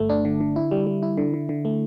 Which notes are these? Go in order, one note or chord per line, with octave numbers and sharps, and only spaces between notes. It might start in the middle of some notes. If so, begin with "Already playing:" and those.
Already playing: G1 A3
D4
D3
D3
E4
G3
G3
E4
D3
D3
D3
A3